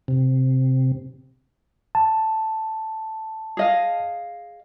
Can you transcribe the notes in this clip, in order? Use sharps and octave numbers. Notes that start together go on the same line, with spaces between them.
C3
A5
G#4 D#5 F5